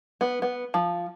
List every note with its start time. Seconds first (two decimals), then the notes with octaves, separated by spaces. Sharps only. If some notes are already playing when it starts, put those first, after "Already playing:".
0.21 B3
0.42 B3
0.74 F3